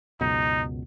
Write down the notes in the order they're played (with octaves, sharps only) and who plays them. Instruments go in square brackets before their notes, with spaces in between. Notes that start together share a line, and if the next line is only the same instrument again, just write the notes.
[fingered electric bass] C#2 F#2 B2 [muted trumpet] D#4